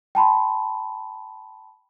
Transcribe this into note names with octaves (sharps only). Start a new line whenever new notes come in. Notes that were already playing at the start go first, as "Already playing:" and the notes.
G5 A5 B5 C6